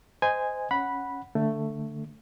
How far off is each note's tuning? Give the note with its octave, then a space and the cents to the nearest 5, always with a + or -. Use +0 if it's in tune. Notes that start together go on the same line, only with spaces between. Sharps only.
C5 -25 D#5 +0 G#5 -10
C#4 +0 F#5 +0 B5 -10
D3 +0 A3 +10